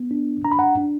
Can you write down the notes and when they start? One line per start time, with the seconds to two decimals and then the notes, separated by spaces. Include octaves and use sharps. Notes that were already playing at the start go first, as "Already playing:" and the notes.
Already playing: B3
0.11 D4
0.44 D4 A#5
0.52 B5
0.59 F#5 A#5
0.77 D4